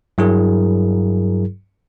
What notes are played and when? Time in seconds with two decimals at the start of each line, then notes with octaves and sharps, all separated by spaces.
0.18 G2 F#3 E4 G#4 A#4